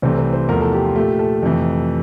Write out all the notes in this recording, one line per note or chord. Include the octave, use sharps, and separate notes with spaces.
C2 C3 E3 A3 C5
C5
C5
E2 C3 F3 A3 A#4
A4
G4
F4
A#2 A3 G4
A4
F2 C3 E3 A3